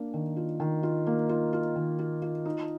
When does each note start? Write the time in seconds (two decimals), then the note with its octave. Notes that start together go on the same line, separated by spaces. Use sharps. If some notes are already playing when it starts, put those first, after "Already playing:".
Already playing: A#3 D4
0.14 D#3
0.36 F4
0.60 D#3
0.83 F4
1.07 A#3
1.29 F4
1.53 F4
1.76 D#3
1.99 F4
2.22 F4
2.45 D#4